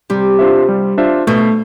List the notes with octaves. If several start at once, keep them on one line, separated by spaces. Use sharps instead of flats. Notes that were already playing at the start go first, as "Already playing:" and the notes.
C3 G3
D4 F4 C5 E5
G3
D4 F4 C5 E5
B2 A3